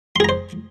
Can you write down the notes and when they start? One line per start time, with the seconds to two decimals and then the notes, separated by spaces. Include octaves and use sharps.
0.16 C6
0.20 G#4
0.24 A#5
0.29 C5